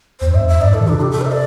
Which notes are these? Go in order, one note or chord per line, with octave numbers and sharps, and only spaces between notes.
E2 C5
G2 E5
E2
E5
G2 D5
A2
A4
E3
C3 D4
G4
A4
C5
E5
D5